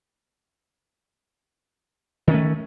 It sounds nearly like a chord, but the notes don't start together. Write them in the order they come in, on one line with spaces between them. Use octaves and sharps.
D#3 C#4 A3